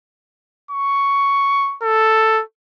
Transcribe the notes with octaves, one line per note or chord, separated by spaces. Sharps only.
C#6
A4